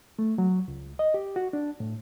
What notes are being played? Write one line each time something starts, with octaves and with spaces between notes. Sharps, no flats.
A3
F#3
C#2
D#5
G4
F#4
D4
A2